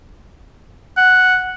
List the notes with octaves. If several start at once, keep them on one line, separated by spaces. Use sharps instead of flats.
F#5